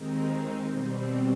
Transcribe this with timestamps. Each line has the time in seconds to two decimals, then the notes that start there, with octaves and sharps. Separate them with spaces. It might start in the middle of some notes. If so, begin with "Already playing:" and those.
Already playing: D#2 D#3 G#3 C4 D#4
0.71 B2 G3 C4